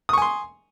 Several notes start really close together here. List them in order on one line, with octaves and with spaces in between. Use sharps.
D#6 C#6 G#5 C6